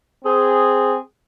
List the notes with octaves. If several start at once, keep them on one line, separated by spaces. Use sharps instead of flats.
C4 G#4